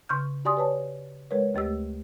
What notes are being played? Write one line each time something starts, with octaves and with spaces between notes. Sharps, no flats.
C#3 C6 C#6 F6 G6
F#4 G4 D5 G#5 C6 D#6
B4 C#5 A5
G#3 A#4 B4 C#5
D2 A3 G4 E6